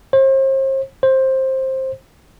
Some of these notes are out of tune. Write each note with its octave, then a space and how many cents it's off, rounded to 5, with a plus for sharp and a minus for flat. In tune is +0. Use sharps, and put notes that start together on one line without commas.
C5 +40
C5 +15